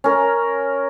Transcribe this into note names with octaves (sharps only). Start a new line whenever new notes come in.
C#4 A#4